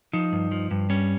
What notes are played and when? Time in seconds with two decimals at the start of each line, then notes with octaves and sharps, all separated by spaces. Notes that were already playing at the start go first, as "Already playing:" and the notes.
0.13 F3 D#4
0.32 G2
0.52 F3
0.71 G2
0.90 G3 C#4